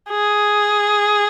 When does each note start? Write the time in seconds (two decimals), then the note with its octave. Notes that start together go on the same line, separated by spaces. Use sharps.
0.10 G#4